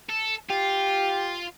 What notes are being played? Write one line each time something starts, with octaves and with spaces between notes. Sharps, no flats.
A4
F4 G4